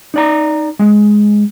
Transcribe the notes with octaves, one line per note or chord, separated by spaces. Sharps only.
D#4 D5 A#5
G#3